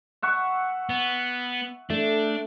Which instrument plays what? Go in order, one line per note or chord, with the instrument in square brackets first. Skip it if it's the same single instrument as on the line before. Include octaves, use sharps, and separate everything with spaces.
[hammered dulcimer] E5 F#5 C#6
[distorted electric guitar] B3
[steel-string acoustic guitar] A3 [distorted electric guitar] D4